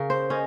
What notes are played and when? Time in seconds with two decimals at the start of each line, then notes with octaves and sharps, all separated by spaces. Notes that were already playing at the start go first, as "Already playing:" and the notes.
Already playing: C#3 C#4 A#4
0.10 C5
0.30 C#4 D#5